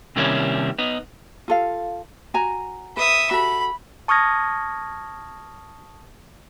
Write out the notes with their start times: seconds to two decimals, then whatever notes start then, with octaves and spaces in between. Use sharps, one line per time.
0.16 C3 D#3 G3 A#3 C#4 E4
0.78 B3 D#4
1.48 F4 A4 F5
2.34 F#4 G#5 A#5
2.97 B4 E5 D#6
3.31 F#4 A4 B5
4.08 A5 C#6 D#6 F6 G#6 A#6